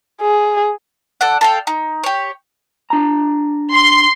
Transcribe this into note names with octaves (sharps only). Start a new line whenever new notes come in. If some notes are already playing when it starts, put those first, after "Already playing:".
G#4
A4 D5 F#5
A4 F5 G5
D#4
G4 C#5
D4 A#5
C6